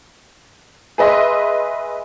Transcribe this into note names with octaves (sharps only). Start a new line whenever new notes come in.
G#4 B4 D#5 E5 C6